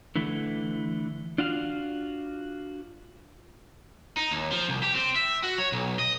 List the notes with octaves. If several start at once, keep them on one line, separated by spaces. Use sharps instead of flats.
D3 E3 A3
D4 F4 F#4 F5
D#4
D#2
F3
C2
G4
C4
E5
F#4
C#5
B1
D#5